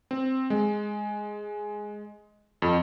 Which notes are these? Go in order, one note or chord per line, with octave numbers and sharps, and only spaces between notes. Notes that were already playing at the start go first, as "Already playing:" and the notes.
C4
G#3
F2